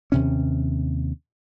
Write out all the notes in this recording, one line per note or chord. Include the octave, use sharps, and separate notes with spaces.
D#2 C3 C#4